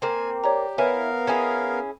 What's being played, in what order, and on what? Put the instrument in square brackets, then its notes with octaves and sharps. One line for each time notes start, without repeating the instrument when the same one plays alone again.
[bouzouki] A#3 C4 [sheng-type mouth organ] G#5
[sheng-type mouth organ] G4 [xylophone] C#5 D5 A#5
[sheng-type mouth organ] B3 A#4 F5 [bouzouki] E4 [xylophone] B4 C#5 G#5
[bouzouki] C#4 E4 G#4